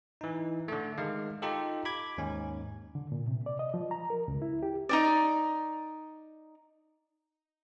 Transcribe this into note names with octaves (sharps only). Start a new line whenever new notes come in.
E3 D#4
D3 A3
D#3 G#3 F5
D#4 F4 G4 A4
B5 D6 G#6
D#2 G#2 C#4
D3
A#2
C3
D5
D#5
F3
A#5
A#4
C#2
E4
G4
D#4 F#4 D5